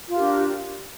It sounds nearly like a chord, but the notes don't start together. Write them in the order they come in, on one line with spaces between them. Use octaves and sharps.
F4 A#4 G4 D4